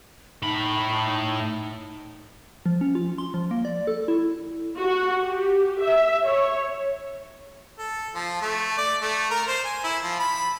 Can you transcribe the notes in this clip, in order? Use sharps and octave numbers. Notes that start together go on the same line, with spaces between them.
A2 D#4 B5
F3
C#4
F4
C6
F3
A#3
D5
A4
E4
F#4
G4
E5
C#5
A4
F3
A3
D5
A3
A#4
C5
G#5
E4
F3
B5